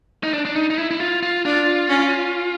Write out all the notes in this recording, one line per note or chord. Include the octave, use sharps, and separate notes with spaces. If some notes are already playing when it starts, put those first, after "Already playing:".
D#4
D4
D4
D#4
D#4
E4
E4
F4
F4
D4 F4
C#4